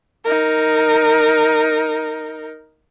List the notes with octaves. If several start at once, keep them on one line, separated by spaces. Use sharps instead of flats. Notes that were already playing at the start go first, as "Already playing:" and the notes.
D#4 A#4